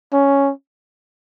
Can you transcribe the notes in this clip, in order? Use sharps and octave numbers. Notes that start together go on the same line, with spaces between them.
C#4